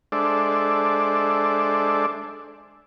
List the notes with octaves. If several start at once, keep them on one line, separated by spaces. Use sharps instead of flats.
G#3 D4 A4 C5 D5 E5